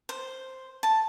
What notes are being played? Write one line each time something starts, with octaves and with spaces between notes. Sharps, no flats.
C5
A5